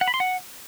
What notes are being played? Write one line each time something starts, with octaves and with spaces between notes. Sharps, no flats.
F#5
B5
C6
F#5